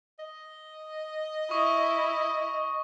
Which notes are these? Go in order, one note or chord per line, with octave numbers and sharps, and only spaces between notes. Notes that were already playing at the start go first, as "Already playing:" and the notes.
D#5
E4 C#6 D#6